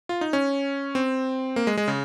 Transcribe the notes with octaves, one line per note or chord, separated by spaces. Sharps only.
F4
D#4
C#4
C4
A#3
G#3
G#3
C#3